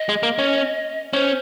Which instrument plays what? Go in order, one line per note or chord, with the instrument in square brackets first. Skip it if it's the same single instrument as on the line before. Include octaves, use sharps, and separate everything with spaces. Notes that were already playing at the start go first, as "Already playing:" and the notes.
Already playing: [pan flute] D#5
[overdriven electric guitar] G#3
A#3
C#4
[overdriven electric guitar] C#4 [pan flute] C5